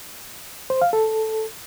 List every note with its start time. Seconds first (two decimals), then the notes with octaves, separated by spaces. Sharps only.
0.70 C5
0.82 F5
0.93 A4